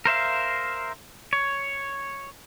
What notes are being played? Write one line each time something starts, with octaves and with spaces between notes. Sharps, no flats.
A#4 C5 E5 F5
C#5